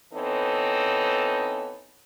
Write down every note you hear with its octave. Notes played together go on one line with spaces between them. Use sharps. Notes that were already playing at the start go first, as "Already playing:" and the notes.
E3 B3 C4 D#4 A4 C#5